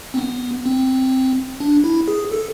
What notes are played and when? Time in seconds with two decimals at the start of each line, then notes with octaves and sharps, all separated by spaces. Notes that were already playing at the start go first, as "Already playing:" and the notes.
0.14 C4
0.17 B3
0.66 C4
1.60 D4
1.84 E4
2.08 G#4
2.32 A4